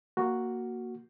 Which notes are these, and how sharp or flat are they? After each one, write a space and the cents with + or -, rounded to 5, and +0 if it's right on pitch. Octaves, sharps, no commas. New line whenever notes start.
A#3 +0 F#4 +0